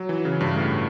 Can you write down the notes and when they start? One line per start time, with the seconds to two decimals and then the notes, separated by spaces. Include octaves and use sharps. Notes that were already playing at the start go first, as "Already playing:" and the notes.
Already playing: F#3
0.09 E3
0.25 C#3
0.41 G2
0.56 A2